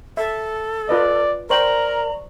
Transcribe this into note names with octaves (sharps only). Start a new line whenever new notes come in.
A4 E5
F4 B4 D5 D#5
A#4 C5 D5 G5 A#5 C#6 F#7